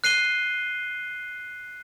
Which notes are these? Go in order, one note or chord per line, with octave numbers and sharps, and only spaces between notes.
F#6 C7 D#7 G7